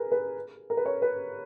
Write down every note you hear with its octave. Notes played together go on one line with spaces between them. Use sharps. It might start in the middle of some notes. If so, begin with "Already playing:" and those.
Already playing: G#4 A#4 B4
B4
A#4
B4
C#5
B4